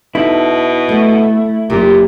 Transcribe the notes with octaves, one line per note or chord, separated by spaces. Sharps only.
E2 B2 D#4 E4 A4
A3 B3
F#1 A#2 G4